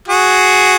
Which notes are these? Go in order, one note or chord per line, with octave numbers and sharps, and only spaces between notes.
F#4 G#4